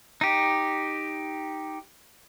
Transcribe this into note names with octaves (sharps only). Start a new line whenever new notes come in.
D#4 G4